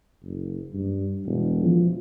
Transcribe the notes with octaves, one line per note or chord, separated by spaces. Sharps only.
F#1
G2
E1
F3